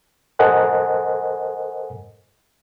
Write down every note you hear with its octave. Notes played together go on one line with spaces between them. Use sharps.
A4 A#4 C5 D#5 F#5 G#5